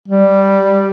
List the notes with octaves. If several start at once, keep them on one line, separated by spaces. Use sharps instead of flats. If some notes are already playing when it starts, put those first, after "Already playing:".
G3